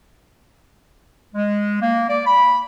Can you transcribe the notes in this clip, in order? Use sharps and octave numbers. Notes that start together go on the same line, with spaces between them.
G#3
A#3
D5
B5